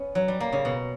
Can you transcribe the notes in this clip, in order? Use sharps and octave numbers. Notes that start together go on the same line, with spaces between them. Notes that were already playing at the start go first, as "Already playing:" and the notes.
Already playing: B3 C#4
F#3
G3
A#3
C#3
B2